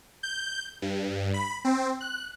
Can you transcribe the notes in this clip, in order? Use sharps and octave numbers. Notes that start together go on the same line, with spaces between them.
G6
G2
B5
C4
F#6